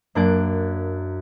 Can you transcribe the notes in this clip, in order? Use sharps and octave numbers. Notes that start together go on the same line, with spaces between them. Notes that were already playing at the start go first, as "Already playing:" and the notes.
F#2 A#3 D4 A5 F#6 D7